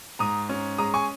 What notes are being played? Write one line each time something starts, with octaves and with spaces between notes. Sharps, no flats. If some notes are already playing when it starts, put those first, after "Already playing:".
G#2 A#5 D#6
C#4
G#3 A#5 D#6
G#5 C#6